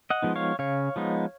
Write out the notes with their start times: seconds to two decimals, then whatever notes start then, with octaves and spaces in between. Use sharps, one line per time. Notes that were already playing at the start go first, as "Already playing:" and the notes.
0.10 D#5 F#5
0.22 F3 G#3 B3 D#4
0.36 C#5 F5
0.59 C#3 C#5 F5
0.96 F3 G#3 B3 D#4